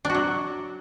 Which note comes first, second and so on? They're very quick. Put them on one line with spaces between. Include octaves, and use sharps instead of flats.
D4 F#4 F#3